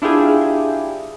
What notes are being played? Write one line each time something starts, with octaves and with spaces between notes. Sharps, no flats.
D4 E4 F4 G4 G#4